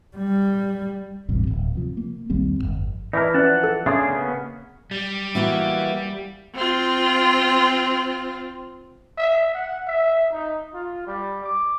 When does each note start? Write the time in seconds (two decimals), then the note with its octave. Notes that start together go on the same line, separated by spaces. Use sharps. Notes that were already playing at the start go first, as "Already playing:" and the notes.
0.17 G3
1.29 A1 E2 G2 C3
1.47 D1
1.75 C3 F3
1.97 A#3
2.30 A#1 D#2 G3 C4
2.58 G1 C2 F2
3.13 E3 D#4 E4 A#4 D5 A5
3.34 F3 C#4 B4 D5 F#5 A5
3.64 A4
3.86 C#3 D4 G#4 E5 C6 D#6
4.08 A#3 B3 C#4
4.91 G3
5.35 E3 A#3 F#4
6.55 C4 F4
9.17 E5
9.54 F#5
9.87 E5
10.32 D#4
10.74 F4
11.07 G3
11.44 D6